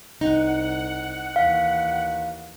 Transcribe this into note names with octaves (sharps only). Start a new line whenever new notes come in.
C2 D#4 F#5
D#2 E3 F5